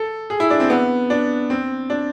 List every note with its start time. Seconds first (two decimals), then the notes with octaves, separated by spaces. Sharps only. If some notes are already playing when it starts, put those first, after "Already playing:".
Already playing: A4
0.30 G#4
0.40 E4
0.50 D4
0.60 C4
0.70 B3
1.10 D4
1.50 C4
1.90 D4